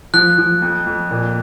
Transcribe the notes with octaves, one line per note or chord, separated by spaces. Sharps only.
F3 F#6
F3
F2
F2
A#2